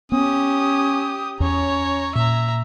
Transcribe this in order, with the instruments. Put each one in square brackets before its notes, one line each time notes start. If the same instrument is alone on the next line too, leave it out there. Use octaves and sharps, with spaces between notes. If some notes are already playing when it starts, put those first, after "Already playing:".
[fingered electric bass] B3 [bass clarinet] C#4 [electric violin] G4 D#6
[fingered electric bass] E2 [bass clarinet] C#4 [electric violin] C#5 A#5
[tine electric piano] A#2 [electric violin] E5 A#5